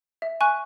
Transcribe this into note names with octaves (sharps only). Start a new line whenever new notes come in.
E5
G#5 C#6 F#6